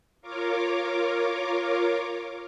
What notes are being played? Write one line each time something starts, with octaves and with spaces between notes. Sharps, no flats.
F4 A#4 C#5 D6